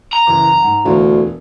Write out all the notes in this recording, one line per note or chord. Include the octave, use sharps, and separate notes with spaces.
A#5
F#1 E3 D6
G#2 F#5
E1 D2 E3 F5